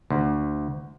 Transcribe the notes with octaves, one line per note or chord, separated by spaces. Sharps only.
D2